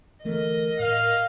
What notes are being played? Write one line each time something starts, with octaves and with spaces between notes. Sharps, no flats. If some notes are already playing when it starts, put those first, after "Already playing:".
D3 E3 A3 A#4 D#5
A2 F5